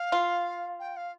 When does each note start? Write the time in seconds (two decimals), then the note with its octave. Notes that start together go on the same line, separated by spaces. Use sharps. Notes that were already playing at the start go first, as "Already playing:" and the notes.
Already playing: F5
0.12 F4
0.79 G5
0.96 F5